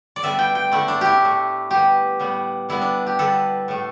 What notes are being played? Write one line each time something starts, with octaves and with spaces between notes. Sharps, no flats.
D5
D3 G3 B3 E5
G5
G5
D3 A3 E4
D4
E4 G4
A2 A3
D3 G3 B3 G4
A2 G3 B3
D3 G3 B3 E4
D4
G4
D3 G3 B3 A4
A2 A3